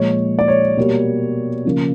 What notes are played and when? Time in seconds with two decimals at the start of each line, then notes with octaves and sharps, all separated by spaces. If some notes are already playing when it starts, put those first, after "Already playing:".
Already playing: A#2 F3 G#3 C#5
0.39 D5
0.48 C#5
0.77 B2 G3 A#3
1.65 C#3 F3 A#3